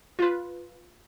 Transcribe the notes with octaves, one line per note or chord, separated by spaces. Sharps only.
F4 B4